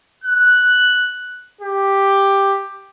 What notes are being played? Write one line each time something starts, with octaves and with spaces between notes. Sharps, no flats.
F#6
G4